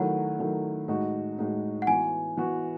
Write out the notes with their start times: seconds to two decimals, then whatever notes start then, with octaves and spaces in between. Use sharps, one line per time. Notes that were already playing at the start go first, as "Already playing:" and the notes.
Already playing: D#3 F#3 A3 E4 F#5
0.39 D#3 F#3 A3 E4
0.88 A2 G#3 D#4 F#4
1.38 A2 G#3 D#4 F#4
1.82 F#5
1.87 E3 B3 F#4 G#5
2.37 E3 B3 F#4